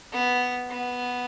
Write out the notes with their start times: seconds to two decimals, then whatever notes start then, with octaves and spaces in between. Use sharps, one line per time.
0.12 B3
0.70 B3